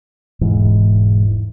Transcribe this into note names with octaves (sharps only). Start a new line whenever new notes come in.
E1 G#2 E3